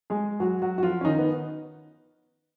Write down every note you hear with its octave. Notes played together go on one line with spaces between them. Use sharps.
G#3 G#4
F#3 F#4
F#3 F#4
F#4
F3 F4
C#4
D#3 D#4
B3